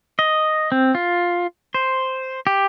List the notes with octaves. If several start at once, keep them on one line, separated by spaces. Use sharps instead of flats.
D#5
C4
F4
C5
G4